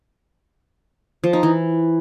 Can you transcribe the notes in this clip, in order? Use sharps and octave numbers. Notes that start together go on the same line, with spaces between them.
F3
D#4
E3